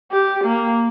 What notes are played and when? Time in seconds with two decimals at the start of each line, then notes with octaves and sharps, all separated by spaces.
0.11 G4
0.44 A#3